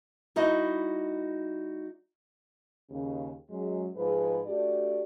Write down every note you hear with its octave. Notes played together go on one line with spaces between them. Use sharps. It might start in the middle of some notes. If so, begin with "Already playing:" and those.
G3 D#4 E4 F#4 D#5
D#2 C#3
F#2 F#3 G#3
G#2 F3 G#3 G#4 B4
A3 D4 F#4 G4 D5